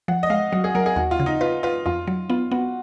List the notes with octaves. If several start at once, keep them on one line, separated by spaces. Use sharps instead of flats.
F3 F#5
D#5
G#3 F5
F#3 F#4
G#4
F#3 A#4
G#4
D#2 F#4
F4
C#3
D#4
F4 B4
F4 B4
F2 F4
F#3
B3 F4
B3 F#4